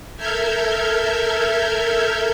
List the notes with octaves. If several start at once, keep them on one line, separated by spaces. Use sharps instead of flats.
A4 A#4 E5 F6 G6 G#6